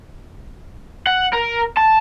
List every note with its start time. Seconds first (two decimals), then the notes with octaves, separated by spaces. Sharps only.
1.07 F#5
1.33 A#4
1.77 A5